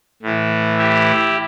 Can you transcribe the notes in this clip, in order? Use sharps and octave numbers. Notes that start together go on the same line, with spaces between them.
A2 E3
E4 G4